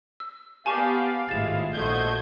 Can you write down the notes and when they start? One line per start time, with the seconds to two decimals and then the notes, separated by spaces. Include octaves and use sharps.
0.20 E6
0.66 B3 G4 D5 F5 G#5 A5 C#6
1.29 G#1 A2 G#3 E4 F4 A6 E7
1.73 A#1 A3 F#4 C5 D#5 G6 G#6